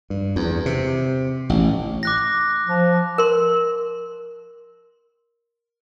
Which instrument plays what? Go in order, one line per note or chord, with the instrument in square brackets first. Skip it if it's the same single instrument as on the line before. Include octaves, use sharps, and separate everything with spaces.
[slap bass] G2
E2
C3
A1
[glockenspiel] D6 F#6 A#6
[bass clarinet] F3
[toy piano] A#4 C6